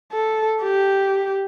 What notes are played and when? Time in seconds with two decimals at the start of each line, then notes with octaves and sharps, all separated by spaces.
0.12 A4
0.62 G4